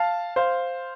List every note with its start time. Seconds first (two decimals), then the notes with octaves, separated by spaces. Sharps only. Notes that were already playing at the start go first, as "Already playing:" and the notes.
Already playing: F5 A5
0.36 C5 F5